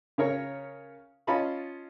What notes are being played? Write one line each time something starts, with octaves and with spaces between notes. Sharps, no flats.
C#3 A#4 C#5
C#4 F4 D#5 A5 B5 C6